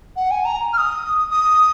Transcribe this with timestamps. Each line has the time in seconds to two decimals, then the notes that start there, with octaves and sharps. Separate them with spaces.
0.16 F#5
0.31 G#5
0.45 A#5
0.73 F6
0.78 D#6
1.30 D#6